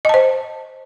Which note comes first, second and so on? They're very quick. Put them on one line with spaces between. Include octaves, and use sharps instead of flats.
D#5 A5 C5